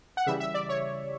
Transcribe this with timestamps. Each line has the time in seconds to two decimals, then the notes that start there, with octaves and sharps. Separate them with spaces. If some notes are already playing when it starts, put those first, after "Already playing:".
0.17 F#5
0.26 C#3 E3 G3 E5
0.40 E5
0.54 D5
0.69 C#5